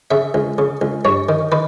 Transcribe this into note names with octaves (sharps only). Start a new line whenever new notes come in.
C#3 E5
C#2
C#3
C#2
G2 C#5
D#3
D#3 B4